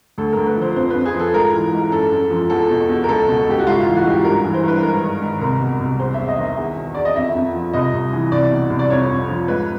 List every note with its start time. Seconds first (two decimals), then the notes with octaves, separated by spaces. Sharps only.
0.18 D2 A4
0.33 D2 A#4
0.47 B4
0.56 F3
0.62 C5
0.76 F2 C5
0.90 F2 B4
1.06 G#4
1.14 F3
1.20 A4
1.33 G#2 A#4
1.53 E3
1.73 G#2
1.92 F#2 A4
2.12 F#2
2.30 F3
2.50 E2 A4
2.70 B2
2.89 E2
3.04 A#4
3.09 C#2 A4
3.28 B2
3.47 C#2 G4
3.59 F#4
3.67 G#2 F4
3.82 E3 F4
3.96 F#4
4.05 G#2
4.10 G4
4.25 G2 A#4
4.44 E3
4.54 C5
4.63 G2 B4
4.83 G#2 A#4
5.02 D#3
5.22 G#2
5.42 C2 A#4
5.60 B2
5.81 C2
5.99 E2 C5
6.14 E2 E5
6.28 D#5
6.38 D#3
6.43 E5
6.57 E2
6.77 B2
6.95 E2 D5
7.05 D#5
7.15 F2 E5
7.35 F2
7.54 F3
7.73 C2 D#5
7.93 C2
8.13 E3
8.32 C2 D5
8.51 B2
8.70 C2
8.79 D5
8.90 F2 C#5
9.09 F2
9.29 F3
9.48 G#2 B4